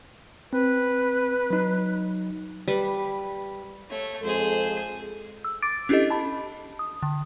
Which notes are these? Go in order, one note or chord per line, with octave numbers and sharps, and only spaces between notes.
C4 B4
F#3 D#4
G3 B4
A3 C#5
F2 G#3 G#4 A4 C5
E6
D6 A6 D7
C#4 D4 E4 G4 A4 D#5
A5 B5
D#6
D3